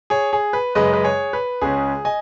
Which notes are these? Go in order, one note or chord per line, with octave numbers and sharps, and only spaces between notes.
G#4 C#5
G#4
B4
F#2 C#3 G#3 B4 D#5
B4
G#4 C#5
B4
C#2 C#3 G#3 C#4 G#4
D#5 G#5